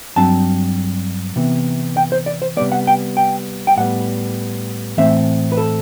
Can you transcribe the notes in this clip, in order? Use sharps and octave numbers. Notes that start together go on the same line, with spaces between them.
G2 F#3 C4 A5
C3 E3 B3
G5
C5
D5
C5
C3 G3 B3 D5
F#5
G5
G5
G5
A2 G3 B3 F#5
A2 E3 A3 C4 E5
B4
A4